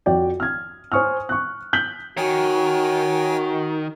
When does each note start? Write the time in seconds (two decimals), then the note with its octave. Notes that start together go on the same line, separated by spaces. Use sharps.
0.06 F2 F#4 D5 G5
0.40 F6 G#6
0.92 C5 G#5 C#6 D#6 F6
1.29 C#6 F#6
1.73 G6 B6 F#7
2.17 D#3 F#4 C#5 G5 G#5